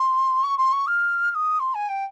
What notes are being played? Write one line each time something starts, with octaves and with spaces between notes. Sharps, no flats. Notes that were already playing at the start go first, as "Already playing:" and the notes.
Already playing: C6
C#6
C6
C#6
F6
F6
D#6
C6
G#5
G5